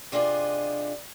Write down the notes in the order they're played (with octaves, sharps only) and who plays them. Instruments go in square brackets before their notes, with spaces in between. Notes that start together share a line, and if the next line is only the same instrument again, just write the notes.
[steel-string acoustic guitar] C3 D4 F4 G#4 D#5